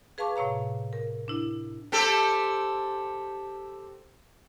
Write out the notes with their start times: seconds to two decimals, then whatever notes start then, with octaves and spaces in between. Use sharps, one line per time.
0.18 G#4 B4 F5 A5 C#6 D6
0.36 A2 C3 C#5 F5 A#5
0.93 A#4
1.28 D4 E4
1.92 C4 G4 A4